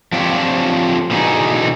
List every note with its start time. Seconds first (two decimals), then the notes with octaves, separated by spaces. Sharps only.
0.12 F3 C4 D4 F4 G4 C#5
1.11 B2 D3 E3 A#3 D#4 G#4